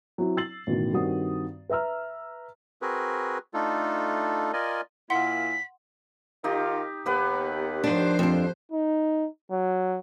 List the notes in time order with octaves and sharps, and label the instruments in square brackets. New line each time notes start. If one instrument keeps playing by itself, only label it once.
[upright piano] F#3 C4 E4
E6 A6 C7 F#7
A1 B2 D#3
G2 D#3 C4 F#4 D#6
B4 E5 A#5 E6 F6
[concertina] C4 F#4 G#4 A#4 B4
A3 D4 D#4 F4 A4
F4 A#4 D5 D#5 G#5
[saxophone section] A#2 A#3 E4 [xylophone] F#5 C6 [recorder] B6
[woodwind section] D#3 F4 [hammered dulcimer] D#4 G4
[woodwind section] D#2 [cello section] B3 [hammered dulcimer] G4 B4 F#5
[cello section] F3 C5 [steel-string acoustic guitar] D4
[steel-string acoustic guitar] F2 D4
[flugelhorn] D#4
F#3